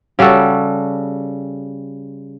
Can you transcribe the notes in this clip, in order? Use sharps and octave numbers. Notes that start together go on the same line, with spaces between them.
C#3 G3 F#4 A4